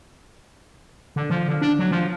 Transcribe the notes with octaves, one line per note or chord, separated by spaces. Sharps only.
D3
F3
D3
D4
F#3
F3